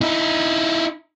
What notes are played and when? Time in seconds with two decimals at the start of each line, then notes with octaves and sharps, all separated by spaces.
0.01 D#4 E4